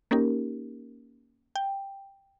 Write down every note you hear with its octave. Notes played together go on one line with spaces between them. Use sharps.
A#3 C#4 D#4 G4 A#4
G5